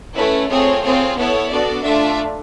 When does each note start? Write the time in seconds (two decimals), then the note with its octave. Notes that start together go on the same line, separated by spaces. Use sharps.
0.15 A3 C#4 E4 B4
0.49 A3 C4 F4 G#4 C#5
0.83 C4 F4 G#4 C#5
1.17 B3 E4 A4 C#5
1.50 B3 D4 F#4 A4 D5
1.84 A3 D4 F4 E5